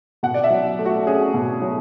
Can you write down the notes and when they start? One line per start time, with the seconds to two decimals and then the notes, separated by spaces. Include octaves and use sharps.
0.23 B2 F#5
0.34 D5
0.44 E5
0.50 F#3
0.79 A3
0.86 F#4
1.06 C#4 G#4
1.34 B2
1.62 F#3